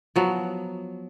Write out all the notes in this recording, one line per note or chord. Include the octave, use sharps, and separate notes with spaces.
F3 F#3 B3